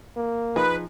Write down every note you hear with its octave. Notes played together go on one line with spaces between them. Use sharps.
A#3
F3 D#4 G#4 B4